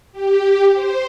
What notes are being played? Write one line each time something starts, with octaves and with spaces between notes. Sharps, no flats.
G4
C5